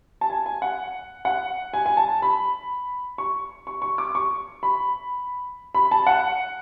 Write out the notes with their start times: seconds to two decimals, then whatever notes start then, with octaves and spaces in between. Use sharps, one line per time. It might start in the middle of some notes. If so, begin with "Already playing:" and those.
0.21 A5
0.30 G#5
0.46 G#5
0.62 F#5
1.25 F#5
1.73 G#5
1.86 G#5
1.97 A5
2.22 B5
3.18 C#6
3.67 C#6
3.82 C#6
3.98 D6
4.15 C#6
4.63 B5
5.75 B5
5.91 A5
6.07 F#5